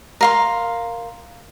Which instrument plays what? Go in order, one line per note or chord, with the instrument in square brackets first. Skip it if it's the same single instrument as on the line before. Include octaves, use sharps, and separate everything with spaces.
[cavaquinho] A#4 F5 C6